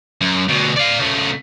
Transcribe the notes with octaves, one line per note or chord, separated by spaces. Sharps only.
F#2
D2 B2
D5 F5
C#3 A3